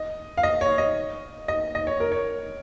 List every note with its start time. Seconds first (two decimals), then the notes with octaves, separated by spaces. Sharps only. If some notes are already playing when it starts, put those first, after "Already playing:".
Already playing: D#5
0.37 F5
0.43 D#5
0.61 C#5
0.78 D#5
1.48 D#5
1.75 D#5
1.87 C#5
2.00 A#4
2.12 C#5